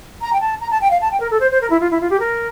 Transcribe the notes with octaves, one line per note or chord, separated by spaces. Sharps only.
A#5
G5
A5
A#5
A5
G5
F5
A5
G5
A#4
A4
C5
C5
A#4
E4
F4
E4
F4
G4
A#4